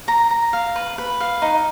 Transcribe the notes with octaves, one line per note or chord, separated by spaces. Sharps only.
A#5
A#5
F5
B4
B4
F5
D#4